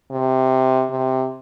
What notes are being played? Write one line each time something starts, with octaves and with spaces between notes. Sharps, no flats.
C3
C3